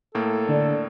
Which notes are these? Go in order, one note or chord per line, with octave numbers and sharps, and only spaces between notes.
A2 A#3 A4
D3 D4